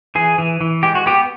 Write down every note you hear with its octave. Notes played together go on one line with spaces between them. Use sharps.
E3 G#4
E3
E3
G#3 G4
F#4
B3 G4